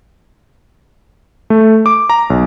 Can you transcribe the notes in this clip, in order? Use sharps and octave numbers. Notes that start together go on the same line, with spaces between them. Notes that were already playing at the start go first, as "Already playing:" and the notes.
A3
D6
A#5
B1